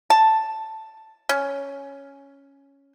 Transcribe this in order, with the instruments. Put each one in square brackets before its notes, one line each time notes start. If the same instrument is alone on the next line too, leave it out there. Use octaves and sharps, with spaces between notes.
[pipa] A5
C#4